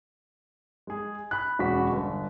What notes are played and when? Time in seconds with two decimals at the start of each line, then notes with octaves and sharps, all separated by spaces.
0.87 G#3 G#4
1.31 B5 F#6
1.59 E1 F#2 F#4 B5 B6
1.92 G1